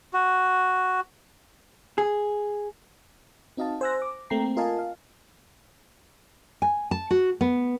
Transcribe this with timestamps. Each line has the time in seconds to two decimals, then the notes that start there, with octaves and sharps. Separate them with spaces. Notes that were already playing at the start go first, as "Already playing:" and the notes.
0.13 F#4
1.98 G#4
3.57 C4 D#4 F#4 D#5 F5 A5
3.81 C5 G#5 E6 F#6 A#6
4.02 D6
4.30 A3 A#3 C4 G5 A#5 C7
4.57 F4 A#4 D#5 F5 G#5 A5
4.79 F5
6.62 G#5
6.91 A5
7.11 F#4
7.41 B3